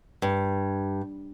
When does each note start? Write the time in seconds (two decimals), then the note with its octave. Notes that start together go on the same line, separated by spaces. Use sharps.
0.22 G2